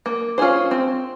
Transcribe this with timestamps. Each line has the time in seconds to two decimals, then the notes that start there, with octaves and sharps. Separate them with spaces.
0.06 A#3
0.38 C#4 F4 G#4 C5
0.71 C4